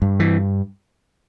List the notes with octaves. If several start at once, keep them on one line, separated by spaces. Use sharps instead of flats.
G2
E3